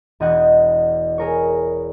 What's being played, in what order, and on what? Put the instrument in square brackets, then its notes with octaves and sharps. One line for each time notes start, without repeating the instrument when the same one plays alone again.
[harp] E1 E2 D#5 F#5 G#6
G#4 A#4 C#5